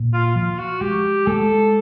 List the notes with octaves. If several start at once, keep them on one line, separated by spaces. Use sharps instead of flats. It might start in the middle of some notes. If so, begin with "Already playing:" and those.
Already playing: A#2
F4
F3 F4
F#4
G#3 G4
G#3 A4